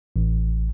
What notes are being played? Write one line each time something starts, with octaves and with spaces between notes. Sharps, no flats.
A1